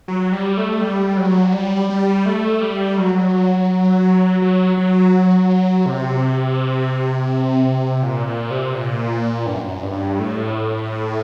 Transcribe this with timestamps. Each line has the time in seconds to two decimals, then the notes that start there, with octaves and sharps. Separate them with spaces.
0.08 F#3
0.32 G3
0.57 A3
0.81 G3
1.17 F#3
1.53 G3
1.90 G3
2.26 A3
2.61 G3
2.98 F#3
4.42 F#3
4.77 F#3
5.86 C3
8.03 A#2
8.27 A#2
8.51 C3
8.74 A#2
9.46 G2
9.55 F#2
9.68 F#2
9.82 G2
10.19 A2